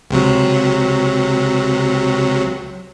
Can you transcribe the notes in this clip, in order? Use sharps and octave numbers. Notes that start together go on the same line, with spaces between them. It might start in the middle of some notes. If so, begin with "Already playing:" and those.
C#2 C3 F#3